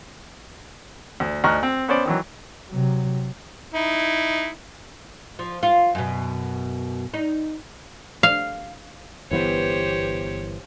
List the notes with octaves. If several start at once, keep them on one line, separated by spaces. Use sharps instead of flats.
D2
D2 D#4 A#5 C#6 F6 F#6
C4
B3 C#4 C5 D5
D#3 E3 F#3
C3 F#3
D#4 E4
F3
F4
F#2 B2
D#4
F5
G1 E3 B3 G4 C5 C#5